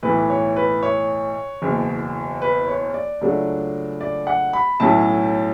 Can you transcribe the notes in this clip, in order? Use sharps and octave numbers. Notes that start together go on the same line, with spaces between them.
B1 A2 E3 B4
C#5
B4
C#5
F#1 E2 B2
B4
C#5
D5
C#2 C#3 F#3 A3 D4
D5
F#5
B5
B1 A2 F#3 C#4 E4 A5